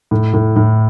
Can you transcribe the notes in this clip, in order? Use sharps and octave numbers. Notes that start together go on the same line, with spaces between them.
A2
A2
A2